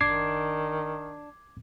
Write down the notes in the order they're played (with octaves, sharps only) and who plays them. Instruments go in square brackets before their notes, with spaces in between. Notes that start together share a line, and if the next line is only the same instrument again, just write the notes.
[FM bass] F#1 [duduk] D#3 [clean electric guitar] D4 [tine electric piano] D6 G#6 C7